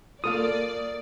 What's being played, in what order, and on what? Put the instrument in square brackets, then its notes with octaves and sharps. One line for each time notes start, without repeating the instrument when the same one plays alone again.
[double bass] A#3 [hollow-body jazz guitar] F4 A4 F5 [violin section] D5 [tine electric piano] D#6